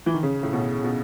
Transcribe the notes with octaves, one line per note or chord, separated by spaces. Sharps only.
E3
D#3
C#3
A2
B2
B2